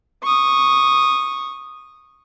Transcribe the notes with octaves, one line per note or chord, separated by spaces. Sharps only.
C#6 D#6